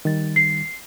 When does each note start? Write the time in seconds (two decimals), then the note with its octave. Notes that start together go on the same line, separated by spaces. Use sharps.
0.05 D#3 G3 A6
0.36 C7